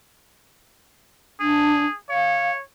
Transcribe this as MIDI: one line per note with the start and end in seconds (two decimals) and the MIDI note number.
1.40 1.83 62
1.40 1.95 68
2.10 2.62 73
2.10 2.50 77